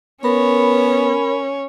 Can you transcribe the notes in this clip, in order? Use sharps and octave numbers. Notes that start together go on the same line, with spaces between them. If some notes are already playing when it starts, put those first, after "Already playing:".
B3 C#4 A#4 C#5 B5